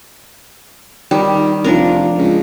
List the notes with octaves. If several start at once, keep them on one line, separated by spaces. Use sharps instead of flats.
D#3 G3
F1 F3 D4 A#4
C#2